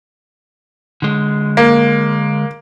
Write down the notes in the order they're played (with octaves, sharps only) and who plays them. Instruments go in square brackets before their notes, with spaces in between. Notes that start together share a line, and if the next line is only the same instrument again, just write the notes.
[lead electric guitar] D3 G#3
[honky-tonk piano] A#3